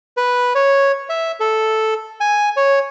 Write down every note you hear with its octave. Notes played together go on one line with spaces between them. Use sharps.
B4
C#5
E5
A4
G#5
C#5